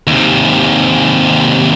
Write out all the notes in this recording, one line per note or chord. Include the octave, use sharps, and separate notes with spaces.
D#2 C3